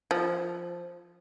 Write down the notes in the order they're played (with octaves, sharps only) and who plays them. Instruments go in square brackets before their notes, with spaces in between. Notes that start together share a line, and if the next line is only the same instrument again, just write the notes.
[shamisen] F3